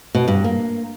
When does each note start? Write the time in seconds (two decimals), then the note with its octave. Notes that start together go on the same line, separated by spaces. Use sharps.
0.15 B2
0.28 G2
0.44 A#3